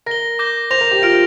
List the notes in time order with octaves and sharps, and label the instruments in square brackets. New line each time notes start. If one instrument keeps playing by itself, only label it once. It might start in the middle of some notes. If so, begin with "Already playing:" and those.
[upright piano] A#4 [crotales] A#6 G7
[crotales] D6 G6 A#6 G7
[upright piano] C5 [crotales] A#6 F7
[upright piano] A#4
G4
[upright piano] F4 [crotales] F6 A#6 D7